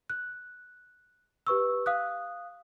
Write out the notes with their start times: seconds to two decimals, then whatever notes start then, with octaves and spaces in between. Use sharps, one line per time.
0.10 F#6
1.47 G4 B4 C#6 E6
1.86 F5 D#6 F#6